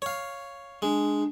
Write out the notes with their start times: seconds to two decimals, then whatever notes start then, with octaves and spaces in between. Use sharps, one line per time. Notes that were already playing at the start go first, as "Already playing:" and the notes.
0.02 C#5 F5
0.82 G#3 D4